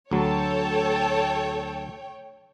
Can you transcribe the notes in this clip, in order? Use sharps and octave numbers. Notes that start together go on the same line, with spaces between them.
D2 F#3 A4 C#5 G5 A5